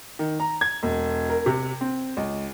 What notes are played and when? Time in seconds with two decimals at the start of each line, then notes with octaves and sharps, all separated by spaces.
0.19 D#3
0.40 A#5
0.61 G#6
0.83 E1
1.29 A#4
1.46 C3
1.81 C4
2.17 C#2